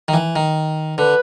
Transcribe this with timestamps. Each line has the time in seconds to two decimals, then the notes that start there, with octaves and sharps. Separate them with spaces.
0.08 D#3
0.14 E3
0.36 D#3
0.98 D3 B4